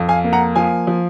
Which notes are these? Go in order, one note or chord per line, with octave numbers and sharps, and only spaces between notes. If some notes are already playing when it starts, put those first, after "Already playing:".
Already playing: F2
F5 G#5
A#3
F#5 A#5
F3 F5 G#5
F3